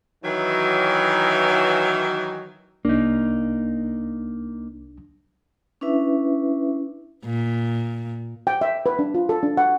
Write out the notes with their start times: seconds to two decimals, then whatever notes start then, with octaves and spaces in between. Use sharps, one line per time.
0.23 D#3 E3 F#3
2.85 C2 A#3 D4 D#4
5.81 C#4 D4 E4 B4 E5
7.25 A#2
8.47 G5
8.61 E5
8.86 B4
8.99 D4
9.14 F4
9.29 A4
9.43 D4
9.57 F#5